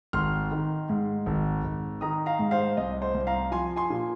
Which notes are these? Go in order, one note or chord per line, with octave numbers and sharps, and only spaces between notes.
G#1 C6 F6
D#3
G#2
G#1
G#1
D#3 A#5 D#6
F5 A#5
G#2
C5 F5
C2 D#5
C5
C2
F5 A#5
F3 G#5 C6
G#5 C6
A#2